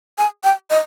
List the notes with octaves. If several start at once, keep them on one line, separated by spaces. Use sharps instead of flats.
G#5
G5
D#5